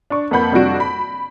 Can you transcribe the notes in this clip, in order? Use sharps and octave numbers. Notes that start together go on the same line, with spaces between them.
D4 C#6
F2 A#3 B4 F#5 B5 G6
F2 C3 G3 D4 F#4 D7
B5